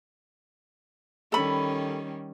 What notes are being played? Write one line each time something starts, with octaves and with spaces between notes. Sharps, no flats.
D#3 G3 C#4 A4 B5